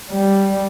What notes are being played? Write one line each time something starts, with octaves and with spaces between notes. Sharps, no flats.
G3